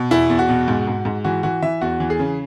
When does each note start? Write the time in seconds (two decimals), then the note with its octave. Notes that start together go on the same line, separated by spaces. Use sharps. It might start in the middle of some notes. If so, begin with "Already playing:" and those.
Already playing: B2
0.11 E2 E4
0.30 E2
0.39 F#4
0.49 B2
0.68 G#2
0.87 G#2
1.05 G#2
1.24 E3 F#4
1.43 E3 F#4
1.62 E3 E5
1.81 E2 F#4
2.00 E3
2.10 G#4
2.19 C#3